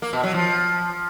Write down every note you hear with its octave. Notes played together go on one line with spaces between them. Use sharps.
A#3
B2
F#3
F3